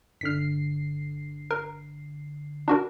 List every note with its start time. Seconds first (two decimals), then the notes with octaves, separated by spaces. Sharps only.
0.21 G1 D3 F6 B6 C7
1.51 A#4
2.68 D4 F#4 A#4